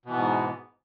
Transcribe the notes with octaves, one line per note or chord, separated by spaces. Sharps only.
G#2 B2 E3 B3